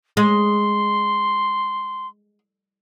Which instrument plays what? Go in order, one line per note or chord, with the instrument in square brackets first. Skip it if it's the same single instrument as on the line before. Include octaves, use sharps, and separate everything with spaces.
[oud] G#3 [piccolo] C6